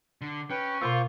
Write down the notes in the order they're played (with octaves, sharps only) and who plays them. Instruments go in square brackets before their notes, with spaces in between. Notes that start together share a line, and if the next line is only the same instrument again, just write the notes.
[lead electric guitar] D3
[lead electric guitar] C#4 [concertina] B4 G5
[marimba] B2 F5 E6 [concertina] A#3 C5 C#6 [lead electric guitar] F4